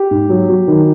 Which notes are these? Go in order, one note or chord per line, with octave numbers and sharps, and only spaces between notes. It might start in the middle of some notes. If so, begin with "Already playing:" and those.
Already playing: G4
G#2
F#3
F#3
D#3